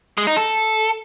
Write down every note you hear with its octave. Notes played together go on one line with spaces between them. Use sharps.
G#3
D#4
A4